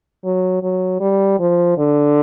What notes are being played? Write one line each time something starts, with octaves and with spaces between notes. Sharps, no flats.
F#3
F#3
G3
F3
D3